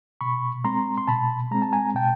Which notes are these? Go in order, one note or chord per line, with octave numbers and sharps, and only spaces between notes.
B2 B5 C#6
G#3 C4 A#5 C6
C6
B2 A5 B5
G#3 C4 A#5
A5
G#5 A#5
B2 G5 A5